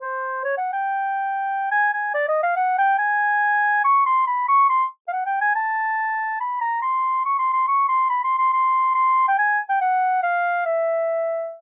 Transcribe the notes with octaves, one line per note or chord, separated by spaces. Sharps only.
C5
C#5
F#5
G5
G#5
G#5
D5
D#5
F5
F#5
G5
G#5
C#6
C6
B5
C#6
C6
F5
F#5
G5
G#5
A5
B5
A#5
C6
C#6
C6
C6
C#6
C6
B5
C6
C6
C6
C6
G5
G#5
G5
F#5
F5
E5